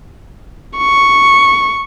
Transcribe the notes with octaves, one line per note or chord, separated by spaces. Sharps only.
C#6